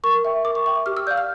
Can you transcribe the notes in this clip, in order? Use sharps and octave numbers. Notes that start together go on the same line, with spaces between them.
A#4 C#6
E5 G5
A#4 D6
C#6
E5 G5 C#6
D6
G4 F6
E6
D5 F5 G6
F6